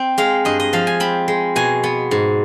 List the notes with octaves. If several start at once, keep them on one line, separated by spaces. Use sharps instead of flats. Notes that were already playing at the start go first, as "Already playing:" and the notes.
Already playing: C4
G#3 F5
G2 D#5
D#5
F3 F5
G#5
C4 B5
G#3
B2 G#5
B3
G#2